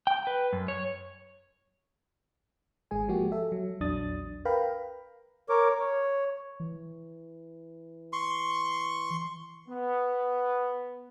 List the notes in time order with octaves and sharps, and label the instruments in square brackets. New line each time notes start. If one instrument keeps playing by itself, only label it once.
[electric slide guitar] G5
B4
F#2
C#5
[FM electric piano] G#1 G#3 G#4 G#5
F3 G#3 A#3 F#4 G4
A4 E5
F#3
A#1 E2 F#3 D4 D#6 A6
A#4 B4 F5 G5 A#5 B5
[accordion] A#4 C#5 D6
C#5
[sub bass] E3
[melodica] C6 C#6
[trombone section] B3